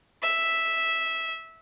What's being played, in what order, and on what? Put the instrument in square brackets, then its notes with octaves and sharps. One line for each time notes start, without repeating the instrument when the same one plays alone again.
[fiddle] E5